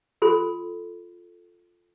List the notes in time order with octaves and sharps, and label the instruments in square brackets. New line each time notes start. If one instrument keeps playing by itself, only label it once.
[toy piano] F4 A4 C6